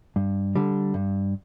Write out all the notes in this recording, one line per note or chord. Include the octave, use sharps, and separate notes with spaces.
G2
D3 G3
G2